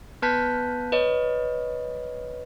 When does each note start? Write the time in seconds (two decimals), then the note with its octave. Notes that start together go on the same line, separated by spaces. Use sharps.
0.22 B3 B4 A5 F#6 G6 B6
0.92 B4 C#5 D#5